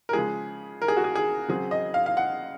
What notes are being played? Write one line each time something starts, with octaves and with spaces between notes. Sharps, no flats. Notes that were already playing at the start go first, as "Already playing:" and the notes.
A#4
C#3 F3 G#3 G#4
A#4
G#4
F#4
G#4
G#4
C#3 F#3 C4 G#4
D#5
F5
F5
F#5